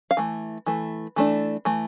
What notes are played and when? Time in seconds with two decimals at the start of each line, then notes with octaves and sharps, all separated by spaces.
0.11 F5
0.17 E3 A3
0.66 E3 A3
1.16 E3 A3 D4
1.65 E3 A3